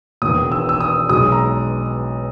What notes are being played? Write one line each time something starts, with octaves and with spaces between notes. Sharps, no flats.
E1 E2 D#3 A#3 D#6
E6
E6
D#6
B1 B2 G#3 D#6
A#5